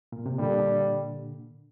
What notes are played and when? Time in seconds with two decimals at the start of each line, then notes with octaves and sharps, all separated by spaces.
0.12 A#2
0.26 C3
0.38 A#2 D3 G3